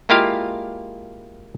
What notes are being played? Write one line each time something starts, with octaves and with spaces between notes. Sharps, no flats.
G#3 A#3 E4 F4 G4 F5